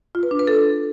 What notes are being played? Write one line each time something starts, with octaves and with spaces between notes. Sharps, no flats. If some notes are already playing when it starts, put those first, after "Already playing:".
F4
B4
D4
B4
A4